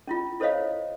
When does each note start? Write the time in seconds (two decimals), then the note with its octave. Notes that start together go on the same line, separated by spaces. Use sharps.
0.07 C#4 E4 F4
0.40 E4 A4 C5 C#5 D#5 F5